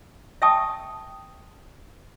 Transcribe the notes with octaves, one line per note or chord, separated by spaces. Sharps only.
E5 G5 A5 C#6 D#6